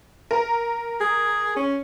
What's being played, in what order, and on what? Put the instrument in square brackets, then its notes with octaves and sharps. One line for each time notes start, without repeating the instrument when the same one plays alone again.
[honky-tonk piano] A#4
[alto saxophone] G#4
C#4